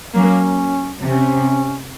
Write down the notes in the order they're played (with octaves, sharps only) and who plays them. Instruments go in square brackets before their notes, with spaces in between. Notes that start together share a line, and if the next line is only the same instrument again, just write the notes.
[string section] F#3 A#3 [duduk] C#4
[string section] C3 [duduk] C#4